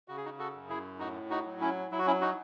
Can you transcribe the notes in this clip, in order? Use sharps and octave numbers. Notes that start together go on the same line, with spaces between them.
C#3 F#4
G#4
D#4 F#4
F#4 A4
F#2
E4 G#4
A2 D#4 F#4
D#4 F#4
F#3
C#4 E4
F#3 E4
F#4
C#4 E4
D#4 F#4